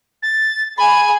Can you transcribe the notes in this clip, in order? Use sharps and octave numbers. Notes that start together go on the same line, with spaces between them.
A6
G#4 G#5 B5